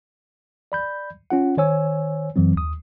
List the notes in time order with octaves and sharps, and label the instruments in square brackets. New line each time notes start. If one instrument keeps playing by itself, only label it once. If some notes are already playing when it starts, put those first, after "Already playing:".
[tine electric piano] D5 B5 G6
C#4 F4 F#5
D#3 C5 C#5 G#5 E6
F#2 E3 F#3 C4
D#2 D#6